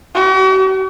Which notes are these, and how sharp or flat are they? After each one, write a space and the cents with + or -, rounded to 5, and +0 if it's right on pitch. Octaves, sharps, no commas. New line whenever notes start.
F#4 +45